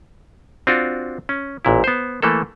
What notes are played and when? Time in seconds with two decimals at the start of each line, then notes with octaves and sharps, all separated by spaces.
0.67 C4 D4 F4 F#4
1.29 C#4
1.65 A1 A#2 E4
1.84 B3 C5
2.22 E3 A3 A#3 A4